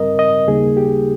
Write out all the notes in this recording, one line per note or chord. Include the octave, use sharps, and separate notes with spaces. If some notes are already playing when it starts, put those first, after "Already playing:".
Already playing: G2 G3 C4 A#4 D#5
D#5
D#2 C#3 G3 A#3 D#4 G#4
G4